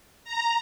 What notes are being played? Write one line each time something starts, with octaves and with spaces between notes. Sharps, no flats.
A#5